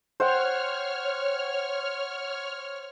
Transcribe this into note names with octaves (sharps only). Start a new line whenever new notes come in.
C5 C#5 F#5 G5 F6